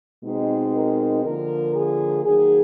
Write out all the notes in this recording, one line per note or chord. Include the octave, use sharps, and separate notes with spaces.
B2 G#3 C4 D#4
A#4
D3 F3 A#3 A#4
G#4
D#3 F#3 A#3 G#4